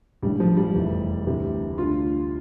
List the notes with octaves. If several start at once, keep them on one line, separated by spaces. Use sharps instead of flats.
A1 G2 D3 G3
F3
G3
F1 E2 E3
D2 C3 E3
D2 D3 F4